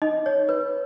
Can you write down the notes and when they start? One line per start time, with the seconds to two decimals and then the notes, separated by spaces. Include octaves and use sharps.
0.02 D#4 D#5
0.26 C#5
0.49 B4